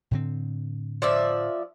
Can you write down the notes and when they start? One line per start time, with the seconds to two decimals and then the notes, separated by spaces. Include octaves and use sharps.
0.11 A2 D3 C4
1.02 F3 D5 E5